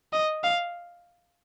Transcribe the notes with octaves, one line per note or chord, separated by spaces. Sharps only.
D#5
F5